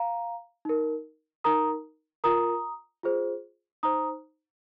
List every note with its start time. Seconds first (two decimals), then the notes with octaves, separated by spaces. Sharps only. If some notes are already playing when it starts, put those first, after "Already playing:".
Already playing: F5 A#5
0.65 D#4 A#4
1.44 D#4 A#4 A#5 D#6
2.24 F4 A#4 A#5 D#6
3.04 F4 G#4 C5
3.83 D#4 C5 A#5 D#6